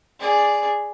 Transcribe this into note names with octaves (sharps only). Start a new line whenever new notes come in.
G#4 D5